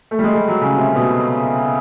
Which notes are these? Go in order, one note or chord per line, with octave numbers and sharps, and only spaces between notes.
A3
G3
G#3
G3
F#3
C#3
C3
B2